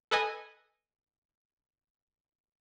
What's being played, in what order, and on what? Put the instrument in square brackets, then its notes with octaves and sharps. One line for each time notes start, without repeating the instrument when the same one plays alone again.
[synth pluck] A4 B4 D#5 G#5